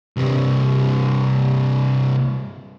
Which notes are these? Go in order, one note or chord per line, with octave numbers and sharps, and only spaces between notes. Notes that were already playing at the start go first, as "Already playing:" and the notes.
C2 G2